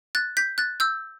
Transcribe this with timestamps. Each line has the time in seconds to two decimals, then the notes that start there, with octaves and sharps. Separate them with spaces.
0.15 F#6 A6
0.37 G6 B6
0.58 F#6 A6
0.80 E6 G6